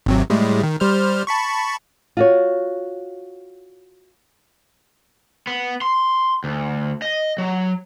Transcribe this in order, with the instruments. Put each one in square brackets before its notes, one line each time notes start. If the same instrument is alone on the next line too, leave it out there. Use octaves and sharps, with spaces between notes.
[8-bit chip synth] G#1 C3 F#3
A2 G3 G#3
D#3
G3 C5 F6
A5 B5 C#6
[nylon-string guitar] F4 F#4 C#5
[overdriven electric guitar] B3
C6
D2
D#5
F#3